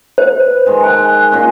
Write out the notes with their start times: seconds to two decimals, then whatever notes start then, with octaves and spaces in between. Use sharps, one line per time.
0.18 C5
0.41 B4
0.66 D#3 G#3
0.84 G#5 F#6
1.32 A#2 C#4